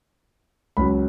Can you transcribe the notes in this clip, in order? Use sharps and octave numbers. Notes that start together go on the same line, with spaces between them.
C#2 C#3 F#3 B5